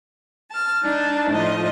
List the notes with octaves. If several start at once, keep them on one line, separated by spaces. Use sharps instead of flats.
A5 F6
D4 D#4 A5
A2 F3 D#5